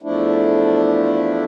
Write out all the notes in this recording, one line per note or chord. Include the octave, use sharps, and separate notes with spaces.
E2 F3 A3 D4 E4